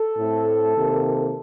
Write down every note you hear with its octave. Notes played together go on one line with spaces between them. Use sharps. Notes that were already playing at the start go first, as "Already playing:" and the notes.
Already playing: A4
A2 A3 C4
C3 D#3 A#3